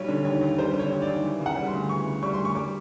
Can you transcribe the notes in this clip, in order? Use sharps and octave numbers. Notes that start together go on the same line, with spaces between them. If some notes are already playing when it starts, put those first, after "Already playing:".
Already playing: B1 G3 C#5
D3
D#2 C#5
D#2
G3 C5
D3
C#5
D#2
D#2 D5
E3
C#3
F#5
G3
C6
D2
E3 C#6
C#3
G3 C#6
C6
D2
C#6
G3 D6